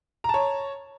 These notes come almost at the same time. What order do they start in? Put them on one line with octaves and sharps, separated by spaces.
A#5 A5 C#5